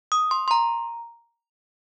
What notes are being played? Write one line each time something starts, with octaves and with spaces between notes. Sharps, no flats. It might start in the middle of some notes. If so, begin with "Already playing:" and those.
D#6
C6
C6
A#5